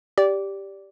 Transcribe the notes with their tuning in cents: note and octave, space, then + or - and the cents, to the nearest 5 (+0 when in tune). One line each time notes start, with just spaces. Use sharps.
G4 +0 D5 -15